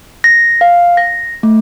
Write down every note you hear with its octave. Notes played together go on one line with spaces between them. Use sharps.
A#6
F5
A#6
A3